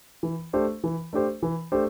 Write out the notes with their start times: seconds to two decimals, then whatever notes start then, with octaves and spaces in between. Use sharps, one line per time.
0.23 E3
0.53 A3 D4 G4 C5
0.84 E3
1.13 A3 D4 G4 C5
1.43 E3
1.72 A3 D4 G4 C5